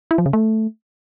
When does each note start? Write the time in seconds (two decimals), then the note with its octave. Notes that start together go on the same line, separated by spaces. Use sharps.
0.11 E4
0.18 F3
0.26 C#3
0.33 A3